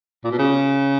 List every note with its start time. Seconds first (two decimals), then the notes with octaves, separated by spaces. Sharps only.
0.24 A#2
0.31 B2
0.39 C#3